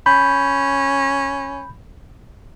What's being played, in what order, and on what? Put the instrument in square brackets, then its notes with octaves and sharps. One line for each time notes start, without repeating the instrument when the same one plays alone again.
[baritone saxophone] C#4 [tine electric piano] B5 G6